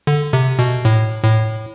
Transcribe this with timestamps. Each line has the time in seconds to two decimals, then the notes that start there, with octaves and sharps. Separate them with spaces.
0.07 D3
0.33 C3
0.59 B2
0.85 A2
1.24 A2